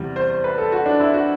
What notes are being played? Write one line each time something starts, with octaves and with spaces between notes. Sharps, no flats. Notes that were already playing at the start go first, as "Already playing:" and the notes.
Already playing: E2 C3 G3
C5
C5
B4
A4
F#4
D4
E4
F#4